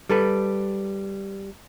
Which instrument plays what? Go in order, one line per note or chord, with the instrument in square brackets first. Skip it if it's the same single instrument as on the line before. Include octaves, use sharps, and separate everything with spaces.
[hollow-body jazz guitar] G3 A4 B4